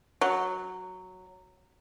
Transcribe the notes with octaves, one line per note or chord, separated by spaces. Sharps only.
F#3